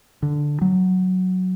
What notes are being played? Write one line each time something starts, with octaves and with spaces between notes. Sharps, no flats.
D3
F#3